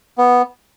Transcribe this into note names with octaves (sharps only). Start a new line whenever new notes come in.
B3